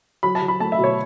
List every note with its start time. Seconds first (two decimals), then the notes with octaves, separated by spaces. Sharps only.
0.23 F#3 B5
0.35 A5
0.42 F#3
0.48 B5
0.60 A3 A5
0.72 E5
0.79 B2
0.84 C#5